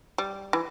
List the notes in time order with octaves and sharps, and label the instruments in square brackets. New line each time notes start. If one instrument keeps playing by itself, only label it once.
[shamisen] G3
E3